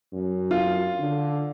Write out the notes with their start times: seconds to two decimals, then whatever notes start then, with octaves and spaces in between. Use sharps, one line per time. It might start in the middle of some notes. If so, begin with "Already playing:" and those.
0.13 F#2
0.51 F4
0.99 D3